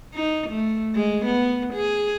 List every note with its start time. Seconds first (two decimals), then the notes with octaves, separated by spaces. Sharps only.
0.14 D#4
0.50 A3
0.95 G#3
1.26 B3
1.74 G#4